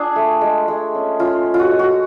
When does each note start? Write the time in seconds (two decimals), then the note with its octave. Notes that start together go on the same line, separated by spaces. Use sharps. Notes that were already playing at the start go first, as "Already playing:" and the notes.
Already playing: D4 F4 G#4
0.16 A3
0.41 G#3
0.68 G#3
0.95 C#4
1.20 C#4 F4
1.46 C#4
1.54 F4
1.60 F#4
1.72 G#3
1.79 F#4